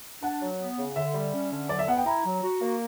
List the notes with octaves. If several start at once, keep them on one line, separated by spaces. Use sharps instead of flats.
D4 F#5
F#3
B3
C#3
D3 E5
G3
C#4
D3
F#3 D5
E5
B3 F#5
G5
E4 A#5
F#3
F#4
A#3